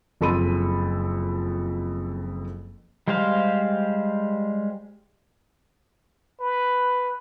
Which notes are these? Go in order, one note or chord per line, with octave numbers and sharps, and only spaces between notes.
F#1 F2 A4 B5 C6 D#7
G3 G#3 G4 C5 F5
B4